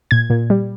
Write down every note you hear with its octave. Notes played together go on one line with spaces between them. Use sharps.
A#2 G#6
A#2
G3